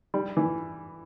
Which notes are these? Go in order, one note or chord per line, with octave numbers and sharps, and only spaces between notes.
G3
E3